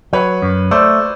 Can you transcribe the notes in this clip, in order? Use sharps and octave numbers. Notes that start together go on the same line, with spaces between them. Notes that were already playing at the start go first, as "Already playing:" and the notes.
F#3 B4 C#5
F#2
A3 C5 D5